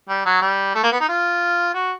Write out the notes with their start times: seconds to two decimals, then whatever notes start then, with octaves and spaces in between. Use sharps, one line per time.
0.09 G3
0.26 F#3
0.42 G3
0.75 A3
0.83 A#3
0.92 B3
1.00 D#4
1.08 F4
1.74 F#4